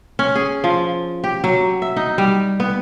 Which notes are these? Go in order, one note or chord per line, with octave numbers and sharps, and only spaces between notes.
C#4
G#4
F3
G4
F#3
E5
D#4
G3
B3